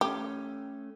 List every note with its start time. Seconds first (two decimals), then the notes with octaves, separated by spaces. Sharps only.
0.01 A3 C#4 G4